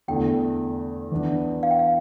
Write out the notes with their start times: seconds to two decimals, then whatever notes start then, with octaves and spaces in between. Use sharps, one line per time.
0.08 E2 D3 A3 G5
1.11 E3 B3 D4
1.63 F5
1.71 G5
1.79 F5